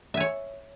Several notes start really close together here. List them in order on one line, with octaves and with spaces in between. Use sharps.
E5 G#5 C#5